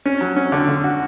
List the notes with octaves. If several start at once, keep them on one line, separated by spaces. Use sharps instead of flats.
C#4
F#3
C#4
D3
D3
F#4